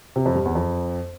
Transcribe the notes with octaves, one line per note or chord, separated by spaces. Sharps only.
C3
F2
G2
E2
F2